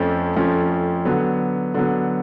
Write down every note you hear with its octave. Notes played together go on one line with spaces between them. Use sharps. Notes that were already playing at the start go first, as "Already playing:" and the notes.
Already playing: F2 F3 A3 C#4
F2 F3 A3 C#4
D3 F#3 B3
D3 F#3 B3